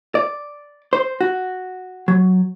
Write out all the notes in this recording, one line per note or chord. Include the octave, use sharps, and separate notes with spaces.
D5
C5
F#4
F#3